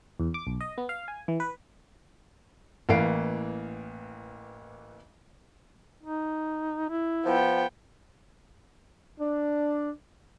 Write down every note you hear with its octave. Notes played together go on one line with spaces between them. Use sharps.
E2
D6
B1
D#5
B3
F5
G#5
E3
B4
A1 E3 A#3 F5 C7 D7
D#4
E4
F3 B3 G5
D4